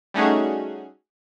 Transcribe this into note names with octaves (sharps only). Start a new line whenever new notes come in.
G3 A3 C#4 D#4 F#4 G#4